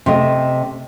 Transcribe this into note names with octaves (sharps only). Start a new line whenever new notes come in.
C3 A3 D#5